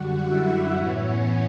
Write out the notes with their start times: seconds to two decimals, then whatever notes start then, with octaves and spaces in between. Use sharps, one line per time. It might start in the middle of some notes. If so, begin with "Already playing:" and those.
Already playing: F#2 D3 G3 F#4 F#5
0.20 E4 E5
0.70 A2 E3 B3 C#4 C#5